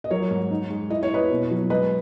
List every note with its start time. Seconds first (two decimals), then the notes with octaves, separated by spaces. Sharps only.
0.04 D#5
0.11 F#3 A#4 C#5
0.31 G#2
0.51 D#4
0.70 G#3
0.90 E4 D#5
1.03 C#5
1.10 E4 B4 D#5
1.30 B2
1.51 F#3
1.70 G#3 B4 D#5